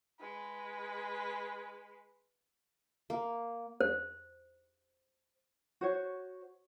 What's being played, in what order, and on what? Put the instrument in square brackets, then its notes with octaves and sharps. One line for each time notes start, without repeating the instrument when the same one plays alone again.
[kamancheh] G#3 B4
[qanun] A#3
[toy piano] C5
[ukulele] F#4 C5 C#5